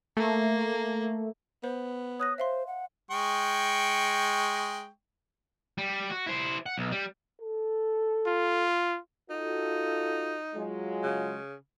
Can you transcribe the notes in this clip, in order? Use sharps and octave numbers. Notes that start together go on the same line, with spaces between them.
A3 A#3
B3 C5
C#5 D#6 F#6 A#6
C5 E5 F5 C6
F#5
G#3 G5 C#6
G3
F#4
E4 C5
F#5
B1
G3
A4
F4
D#4 F4 F#4 A4
F#3 G#3 F4
C#3